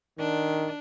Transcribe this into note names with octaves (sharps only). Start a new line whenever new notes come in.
D#3 D4